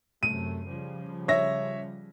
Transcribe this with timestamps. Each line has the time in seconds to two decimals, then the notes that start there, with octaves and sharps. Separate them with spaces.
0.23 F#2 C3 A3 D#7
0.66 C#3 F3 G3
1.28 C#5 E5 A#6